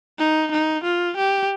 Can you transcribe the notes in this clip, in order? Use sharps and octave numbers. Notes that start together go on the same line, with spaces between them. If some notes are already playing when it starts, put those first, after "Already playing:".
D#4
D#4
F4
G4